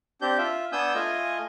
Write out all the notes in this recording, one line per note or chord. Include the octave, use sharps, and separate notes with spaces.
C4 D4 G4 G6
F4 E5
B3 D4 G#5 D#6 E6 G6
A3 F4 D#5 G#5